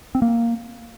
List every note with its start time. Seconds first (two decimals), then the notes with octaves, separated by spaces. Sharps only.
0.15 C4
0.22 A#3